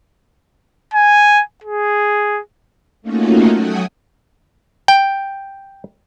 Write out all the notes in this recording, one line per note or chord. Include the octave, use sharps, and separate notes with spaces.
G#5
G#4
A3 A#3 C#4 D#4 F4 F#4
F#3 A3 F#4 G5 G#5 D#6
G5